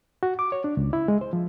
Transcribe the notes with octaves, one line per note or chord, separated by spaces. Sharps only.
F#4
D6
C#5
D4
C#2
E4
G#3
C5
F3